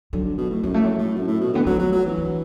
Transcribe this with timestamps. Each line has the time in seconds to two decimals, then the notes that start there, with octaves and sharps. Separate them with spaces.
0.13 D3 F#3
0.25 D3
0.38 B2
0.50 A2
0.63 F#2 F#3
0.74 A3
0.81 A2 F#3
0.98 A2
1.16 F#2
1.28 A2
1.41 B2
1.53 D3 B3
1.66 F#3 A3
1.79 F#3
1.93 F#3
2.05 E3
2.18 D4